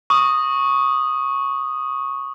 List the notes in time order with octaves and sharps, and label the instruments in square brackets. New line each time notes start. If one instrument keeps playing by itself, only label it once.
[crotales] C#6 D#6